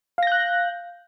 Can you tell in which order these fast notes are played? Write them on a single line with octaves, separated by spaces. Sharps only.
F5 A#6 G6 F#6